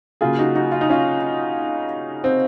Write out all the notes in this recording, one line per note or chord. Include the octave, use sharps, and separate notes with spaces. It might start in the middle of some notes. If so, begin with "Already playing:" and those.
C#3 F#3 A#3 F4 G#4
D#4 F#4
D#4 F#4
F4
D#4
C#4 F4
C4